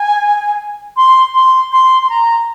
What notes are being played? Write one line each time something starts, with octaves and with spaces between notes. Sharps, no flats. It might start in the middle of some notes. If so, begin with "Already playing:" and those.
Already playing: G#5
C6
C6
C6
C6
A#5